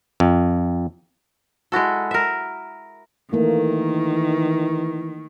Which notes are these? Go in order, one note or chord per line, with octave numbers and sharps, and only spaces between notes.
F2
G#3 E4 F#4 A4
A#4 E5
D#3 E3 A3 A#3